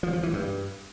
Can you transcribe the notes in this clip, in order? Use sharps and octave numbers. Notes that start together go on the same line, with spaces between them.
F3
F3
E3
G2